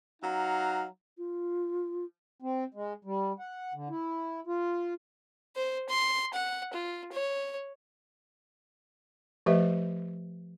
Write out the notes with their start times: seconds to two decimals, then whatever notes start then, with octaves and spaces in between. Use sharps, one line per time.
0.22 F#3 D#4 F5 F#5 A#5
1.18 F4
2.42 C4
2.74 G#3
3.05 G3
3.39 F#5
3.74 D3
3.90 E4
4.47 F4
5.56 C5
5.89 C6
6.34 F#5
6.74 F4
7.12 C#5
9.46 F3 A3 G4 B4 D#5 E5